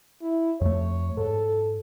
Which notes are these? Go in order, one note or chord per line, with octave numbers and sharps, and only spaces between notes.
E4
F2 A3 C#5
G#2 A4